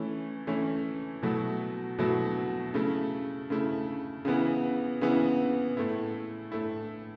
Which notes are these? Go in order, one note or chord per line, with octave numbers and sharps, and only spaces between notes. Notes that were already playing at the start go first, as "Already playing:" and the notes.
Already playing: E3 A3 C#4 E4
E3 A3 C#4 E4
B2 F#3 A3 E4
B2 F#3 A3 E4
C#3 A3 E4
C#3 A3 E4
C#3 E3 B3 E4
C#3 E3 B3 E4
A2 A3 E4
A2 A3 E4